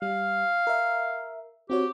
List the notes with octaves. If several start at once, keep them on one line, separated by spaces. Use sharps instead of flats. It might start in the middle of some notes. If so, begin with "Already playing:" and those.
G3 F5
A#4 E5
C4 F#4 G4 C#5